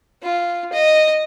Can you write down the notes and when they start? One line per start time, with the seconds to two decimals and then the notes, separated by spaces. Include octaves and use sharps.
0.23 F4
0.73 D#5